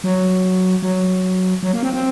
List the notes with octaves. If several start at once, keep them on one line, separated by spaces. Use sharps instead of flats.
F#3
F#3
F#3
A#3
C4
C4